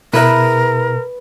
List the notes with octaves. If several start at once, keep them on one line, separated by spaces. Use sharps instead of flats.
B2 E4 G#4 A#4 B4 E5